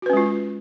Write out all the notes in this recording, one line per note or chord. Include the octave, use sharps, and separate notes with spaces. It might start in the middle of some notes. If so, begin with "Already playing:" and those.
G#3 C#4 F4 F#4 B4